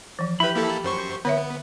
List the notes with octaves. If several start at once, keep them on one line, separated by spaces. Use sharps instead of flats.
E3 F3
E4 G4 B4 E5 B5
A#3 E4 A4
F#2 C5 C#6
D3 B3 C#5 E5